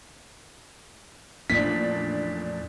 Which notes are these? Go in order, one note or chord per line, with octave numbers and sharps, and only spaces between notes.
A1 F2 A#2 A3 C#4 D4 B6